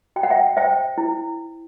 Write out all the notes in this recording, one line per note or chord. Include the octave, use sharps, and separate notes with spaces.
F#4 G5
F#5
E5 G5
C5 E5 G5
E4